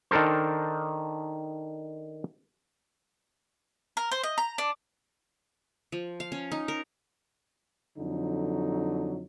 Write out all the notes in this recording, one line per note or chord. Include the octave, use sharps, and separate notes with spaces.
D#3 D4 A4 A#4 C5
A#4
C5
D#5
A#5
D4
F3
F5
C#4
D#4
A#4
F2 D3 F#3 D#4